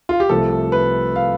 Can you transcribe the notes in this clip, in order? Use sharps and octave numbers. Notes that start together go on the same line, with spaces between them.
F4
G4
C2 C3 F3 A3 A4
B4
F5